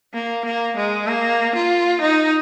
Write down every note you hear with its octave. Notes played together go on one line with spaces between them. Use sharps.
A#3
A#3
G#3
A#3
F4
D#4